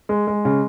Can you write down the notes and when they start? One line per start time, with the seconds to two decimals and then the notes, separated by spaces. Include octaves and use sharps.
0.09 G#3
0.27 G#3
0.45 C#3